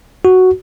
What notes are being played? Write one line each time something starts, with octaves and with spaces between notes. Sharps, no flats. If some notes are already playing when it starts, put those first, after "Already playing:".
F#4